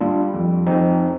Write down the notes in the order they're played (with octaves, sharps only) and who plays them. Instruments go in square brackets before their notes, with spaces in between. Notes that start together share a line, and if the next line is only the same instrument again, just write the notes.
[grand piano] G3 [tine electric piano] D4 F4
[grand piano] F2
[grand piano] F2 [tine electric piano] C4 D#4